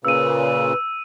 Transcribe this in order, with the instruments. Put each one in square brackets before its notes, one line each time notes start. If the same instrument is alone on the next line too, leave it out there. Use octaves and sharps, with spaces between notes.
[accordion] A#2 C#3 [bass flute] B4 [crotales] E6 D#7